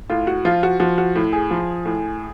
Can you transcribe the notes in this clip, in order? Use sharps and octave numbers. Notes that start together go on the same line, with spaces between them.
A2 F4
F#4
F3 F4
F#4
F3 F#4
F#4
A2
G#4
F3
A2